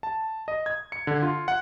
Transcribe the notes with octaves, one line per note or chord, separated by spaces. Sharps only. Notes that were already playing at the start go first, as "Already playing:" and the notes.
A5
D#5
G#6
C#7
D3
F4
F#5